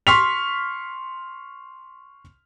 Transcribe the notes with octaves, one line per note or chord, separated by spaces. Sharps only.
C6 C#6 F6 B6 F7